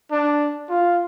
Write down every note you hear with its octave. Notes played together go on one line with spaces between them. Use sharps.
D4
F4